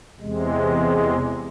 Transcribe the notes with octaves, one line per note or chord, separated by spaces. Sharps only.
E2 C3 G#3